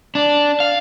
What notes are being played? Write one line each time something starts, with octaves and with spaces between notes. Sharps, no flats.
D4
F5